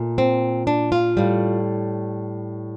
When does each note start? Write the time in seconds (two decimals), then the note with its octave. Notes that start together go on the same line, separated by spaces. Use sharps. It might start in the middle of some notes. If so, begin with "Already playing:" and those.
Already playing: A#2 A3
0.18 C4
0.67 D4
0.92 F4
1.17 A2 G3